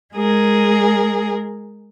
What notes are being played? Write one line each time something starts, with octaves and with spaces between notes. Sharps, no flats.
G#3 G#4 A#4